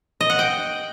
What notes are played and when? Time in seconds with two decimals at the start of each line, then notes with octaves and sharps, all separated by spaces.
0.21 D#5
0.30 F#5
0.39 G5